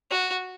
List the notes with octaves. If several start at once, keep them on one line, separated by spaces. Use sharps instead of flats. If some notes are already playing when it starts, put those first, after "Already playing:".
F#4